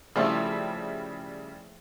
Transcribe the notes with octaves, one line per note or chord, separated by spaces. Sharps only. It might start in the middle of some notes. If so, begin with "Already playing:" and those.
C#3 F3 G3 A3 E4